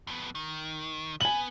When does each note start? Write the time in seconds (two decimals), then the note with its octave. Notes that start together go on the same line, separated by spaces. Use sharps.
0.07 F2 B3
0.35 D#3
1.21 B3 G#5 F#7